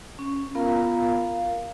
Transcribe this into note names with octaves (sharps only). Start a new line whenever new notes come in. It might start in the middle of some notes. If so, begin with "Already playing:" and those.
C#4
B3 F4 A#4 F5 A#5
F5